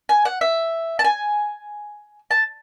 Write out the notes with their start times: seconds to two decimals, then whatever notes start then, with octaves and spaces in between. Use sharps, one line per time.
0.09 G#5
0.25 F#5
0.41 E5
0.99 A5
1.04 G#5
2.31 A5